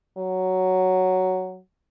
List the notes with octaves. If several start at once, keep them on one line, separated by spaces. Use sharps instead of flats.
F#3